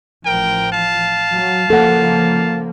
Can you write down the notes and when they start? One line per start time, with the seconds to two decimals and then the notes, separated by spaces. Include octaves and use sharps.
0.25 A1 F3 A#4 G5
0.73 F5 A5
1.32 F#3
1.70 C#3 F3 A#3 A4 F#5